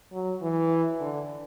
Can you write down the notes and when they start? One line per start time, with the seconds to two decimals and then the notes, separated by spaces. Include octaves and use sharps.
0.12 F#3
0.42 E3
1.01 D3